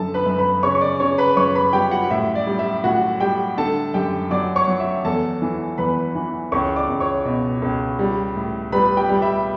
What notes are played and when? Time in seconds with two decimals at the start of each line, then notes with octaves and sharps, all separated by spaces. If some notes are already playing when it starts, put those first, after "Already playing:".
Already playing: F#2 D3 A4 A5
0.14 B4 B5
0.26 F#2
0.39 B4 B5
0.63 C#3 C#5 C#6
0.75 C#6
0.81 D5 D6
1.00 C#3 C#5 C#6
1.18 B4 B5
1.37 F#2 C#5 C#6
1.55 B4 B5
1.73 G3 G4 G5
1.91 F#4 F#5
2.11 A2 E5
2.35 D5
2.47 G3
2.59 E5
2.84 A2 F#4 F#5
3.20 G3 G4 G5
3.57 D3 A4 A5
3.94 F#2 G4 G5
4.30 F#3 D5 D6
4.56 C#5 C#6
4.68 F#3
4.80 E5
5.05 E2 A4 A5
5.42 E3
5.78 E2 B4 B5
6.15 E3
6.52 C#2 C#5 C#6
6.76 D5 D6
6.89 C#2
7.00 C#5 C#6
7.25 B2
7.62 C#2
7.99 G3
8.36 A2
8.72 G3 B4 B5
8.97 G4 G5
9.09 G3
9.22 E5